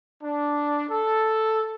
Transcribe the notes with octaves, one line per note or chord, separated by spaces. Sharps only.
D4
A4